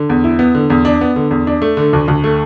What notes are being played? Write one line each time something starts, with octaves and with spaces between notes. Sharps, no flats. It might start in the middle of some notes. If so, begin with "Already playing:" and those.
Already playing: D3
E2
E4
B3
D3
E2
D4
B3
D3
E2
D4
A3
D3
D2
D2
A3